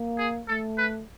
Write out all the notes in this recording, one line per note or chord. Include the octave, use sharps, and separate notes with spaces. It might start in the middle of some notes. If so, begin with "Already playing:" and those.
Already playing: A#3
G#4
A3 A4
B4